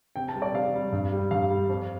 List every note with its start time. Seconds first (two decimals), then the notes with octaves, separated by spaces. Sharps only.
0.16 C3 G5
0.29 A5
0.35 G3
0.42 D5
0.54 C3 F5
0.74 G3
0.92 G2
1.12 G3
1.31 G2 F5
1.50 G3
1.69 F2